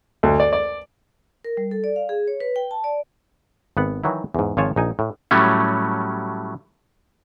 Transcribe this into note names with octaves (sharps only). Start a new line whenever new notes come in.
D2
D5
D5
A#4
G3
A4
D5
F5
G#4
C#5
B4
G5
A5
D5
G#1 B3 F#5
D#3 E3 F#3 D#4 E4
E2 G#2
G#1 F3 F4 C#5 G#5 A5
A#1 D#4 G#5
A2
A2 F#3 G3 A3 C#4